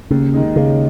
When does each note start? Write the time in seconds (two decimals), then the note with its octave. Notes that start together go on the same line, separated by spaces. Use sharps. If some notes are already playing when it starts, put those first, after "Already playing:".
0.10 D#2 C#3
0.34 D#3 G#3 D#4
0.56 D#2 C#3